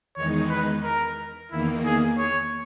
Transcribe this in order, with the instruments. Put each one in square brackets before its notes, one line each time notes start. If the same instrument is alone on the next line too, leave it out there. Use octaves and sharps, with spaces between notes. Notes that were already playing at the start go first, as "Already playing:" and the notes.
[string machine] E2 D#3 G#3 D#4 [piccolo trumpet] C#5
[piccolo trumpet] B4
A#4
[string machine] E2 D#3 A#3 [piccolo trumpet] E4
[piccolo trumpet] G#4
C#5